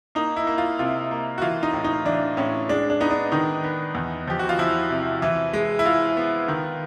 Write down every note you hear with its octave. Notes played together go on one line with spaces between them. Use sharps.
A#3 D#4
E4
A#3
F4
C3 F4
A#3
F#4
E3 F4
D#4
A2
D#4
E3 D4
A2 C#4
G#3 D4
D4
B3 D#4
D4
D#3 D#4
B3
E2
F3 G4
F#4
F4
F3 E4
C3
E3
G#3
E4
G#3 F4
B3
D#3